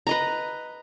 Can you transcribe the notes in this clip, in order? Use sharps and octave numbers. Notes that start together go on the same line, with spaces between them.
B4 D#5 A#5